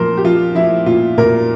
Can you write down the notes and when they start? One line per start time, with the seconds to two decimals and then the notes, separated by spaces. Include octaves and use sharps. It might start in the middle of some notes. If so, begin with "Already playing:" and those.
Already playing: A#2 F3 A#4 C5
0.17 G4
0.24 F3 F4
0.55 F3 E4
0.86 A#2 F4
1.18 A#2 A#4